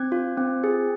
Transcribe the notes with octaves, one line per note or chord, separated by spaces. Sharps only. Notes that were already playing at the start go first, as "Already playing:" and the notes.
Already playing: C4 G#6
F4
C4
G#4